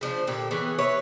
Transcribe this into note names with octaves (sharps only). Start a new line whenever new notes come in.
C#3 F3 D4 C5
A#2 D3 G4 A4
E3 B3 G#4 C#5
E4 B4 C#5